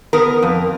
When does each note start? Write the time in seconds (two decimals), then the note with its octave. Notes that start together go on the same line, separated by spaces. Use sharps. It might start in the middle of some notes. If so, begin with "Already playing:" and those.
0.13 B3 A#4
0.42 F2